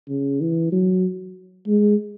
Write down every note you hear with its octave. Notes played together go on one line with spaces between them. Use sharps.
C#3
E3
F#3
G#3